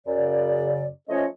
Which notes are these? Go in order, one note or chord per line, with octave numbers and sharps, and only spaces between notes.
F#2 C#3 D5
F3 A3 C#4 C#5 D#5